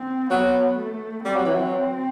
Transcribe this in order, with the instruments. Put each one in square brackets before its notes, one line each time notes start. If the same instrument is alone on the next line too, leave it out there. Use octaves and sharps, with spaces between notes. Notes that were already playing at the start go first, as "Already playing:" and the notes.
Already playing: [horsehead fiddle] C4
[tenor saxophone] F#3 [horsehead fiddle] B3
[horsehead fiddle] A3
[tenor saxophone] G3 [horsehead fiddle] C4
[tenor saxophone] F#3
E3
F#3